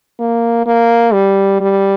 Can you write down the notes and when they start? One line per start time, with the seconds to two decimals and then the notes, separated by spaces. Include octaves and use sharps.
0.20 A#3
0.66 A#3
1.13 G3
1.61 G3